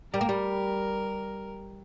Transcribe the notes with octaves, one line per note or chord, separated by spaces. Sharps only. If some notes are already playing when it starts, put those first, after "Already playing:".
G3 A#4
A#3
G3